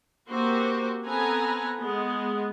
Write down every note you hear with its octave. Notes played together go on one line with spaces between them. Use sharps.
A#3 C4 F#4 G4 C5
B3 C4 A4 B4 G#5 A#5
G#3 B3